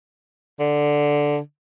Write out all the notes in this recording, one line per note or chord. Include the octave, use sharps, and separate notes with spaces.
D3